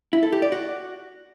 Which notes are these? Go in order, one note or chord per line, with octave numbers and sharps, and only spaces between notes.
E4
A4
G4
D5
F#4